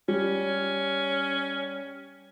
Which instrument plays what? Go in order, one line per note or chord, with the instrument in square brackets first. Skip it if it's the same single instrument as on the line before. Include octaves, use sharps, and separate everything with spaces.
[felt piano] G3 [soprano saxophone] C#4